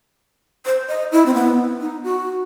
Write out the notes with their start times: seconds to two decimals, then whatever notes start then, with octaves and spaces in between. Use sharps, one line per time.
0.66 C5
0.88 D#5
1.12 E4
1.26 C4
1.34 B3
1.81 D#4
2.04 F#4